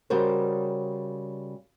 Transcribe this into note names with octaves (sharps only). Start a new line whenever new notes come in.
C#3 G3 F#4 A#4 C5